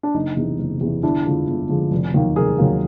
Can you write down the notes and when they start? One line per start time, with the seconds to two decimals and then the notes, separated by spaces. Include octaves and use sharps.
0.03 D4
0.14 F#1 D#4
0.37 E2 C3 E3
0.59 F#1
0.81 E2 C3 E3
1.03 G1 D4 E4
1.25 F2 D3 F3 G#3
1.47 G1
1.69 F2 D3 F3 G#3
1.91 F1
2.14 D#2 D#3 F#3 A#3
2.36 F1 G#4 A#4
2.58 D#2 D#3 F#3 A#3